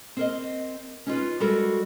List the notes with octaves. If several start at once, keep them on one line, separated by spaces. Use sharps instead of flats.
C4 A#4 D#5
C#4 D#4 F4 B4
G3 G#3 F#4 A4 A#4